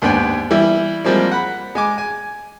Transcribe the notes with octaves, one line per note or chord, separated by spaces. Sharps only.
D#2 G#2 B3 D4 G5 G#5
E3 G3 E4
F3 G3 G#3 A#3 C4
F#5 B5
G#3 G#5 D6
G#5